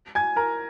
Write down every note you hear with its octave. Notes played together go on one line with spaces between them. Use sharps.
G#5 G#6
A#4 A#5